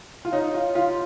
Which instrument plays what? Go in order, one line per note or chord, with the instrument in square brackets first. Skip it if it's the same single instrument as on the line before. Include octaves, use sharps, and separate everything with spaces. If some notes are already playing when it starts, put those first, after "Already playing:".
[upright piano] F4
[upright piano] D#4 [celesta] C#5
[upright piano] F4
[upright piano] F4 [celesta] F5 C6